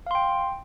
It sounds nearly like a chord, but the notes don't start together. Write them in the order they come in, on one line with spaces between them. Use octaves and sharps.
F5 C6 G5